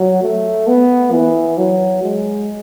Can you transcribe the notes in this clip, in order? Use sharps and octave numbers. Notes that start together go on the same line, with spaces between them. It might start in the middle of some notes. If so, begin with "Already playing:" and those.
Already playing: F#3
A3
B3
E3
F#3
G#3